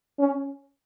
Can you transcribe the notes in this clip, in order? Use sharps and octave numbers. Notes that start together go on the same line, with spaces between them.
C#4